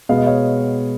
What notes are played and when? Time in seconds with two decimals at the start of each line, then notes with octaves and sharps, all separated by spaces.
0.09 B2 G#3 B3 F5
0.18 D#5
0.26 C#5 F5